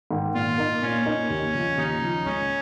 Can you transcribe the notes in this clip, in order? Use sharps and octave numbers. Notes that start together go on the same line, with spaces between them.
G#2 D#3
A#2 F4
A#3 D#4
A#2 C#4
A#3 D#4
D#2
C#3 F3
D#2 D#4
C#3 F3
C#2 C#4